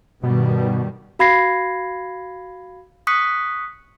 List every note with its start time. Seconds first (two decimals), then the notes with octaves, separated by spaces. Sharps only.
0.23 G2 B2 D#3 G3
1.19 F#4 F5 B5 G#6 A#6 C7
3.07 C#6 D#6 F#6 B6 C#7